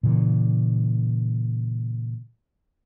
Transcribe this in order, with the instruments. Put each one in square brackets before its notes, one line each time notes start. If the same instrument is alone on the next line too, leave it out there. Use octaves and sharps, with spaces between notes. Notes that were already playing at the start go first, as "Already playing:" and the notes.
[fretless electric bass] A#2 C#3 E3